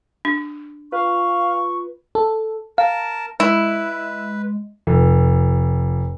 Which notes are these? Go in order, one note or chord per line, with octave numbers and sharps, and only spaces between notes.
D4
F4 B4 F5 C#6
A4
A#4 F5 A5
G#3 E4 B4
F1